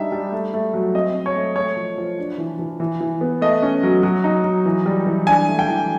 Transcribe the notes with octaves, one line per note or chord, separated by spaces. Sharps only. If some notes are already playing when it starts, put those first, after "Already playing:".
Already playing: G3 D4 D#4 E5
G3
A3
A3
F#3
C4 D#5
C4
C#5
A3
A3 C#5
F3
F3
D4
E3
E3
E3
E3
B3
A3 D#5
C#4
F#3
F#3
D#4
F#3
E3
G3
E3
D4 G#5
A3
G5
E3